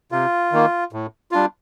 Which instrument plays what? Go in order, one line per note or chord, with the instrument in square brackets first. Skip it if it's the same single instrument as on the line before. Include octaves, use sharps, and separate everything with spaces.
[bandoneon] C3 [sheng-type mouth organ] F4
[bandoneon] D#3 A#3
A2
G3 D4 F4